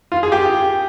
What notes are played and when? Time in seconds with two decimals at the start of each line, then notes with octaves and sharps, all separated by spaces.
0.12 F4
0.23 G#4
0.32 G4